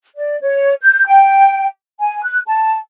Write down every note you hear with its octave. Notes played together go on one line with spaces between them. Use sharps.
D5
C#5
G6
G5
G#5
F#6
A5